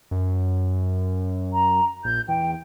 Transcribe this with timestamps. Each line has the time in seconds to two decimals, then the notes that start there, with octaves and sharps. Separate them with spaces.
0.11 F#2
1.53 A#5
2.05 A#1 G6
2.28 E2 G5